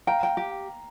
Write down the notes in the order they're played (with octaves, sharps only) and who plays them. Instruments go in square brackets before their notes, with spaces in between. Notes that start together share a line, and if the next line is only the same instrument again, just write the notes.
[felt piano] F5 A#5 [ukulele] G5
[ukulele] G5
G4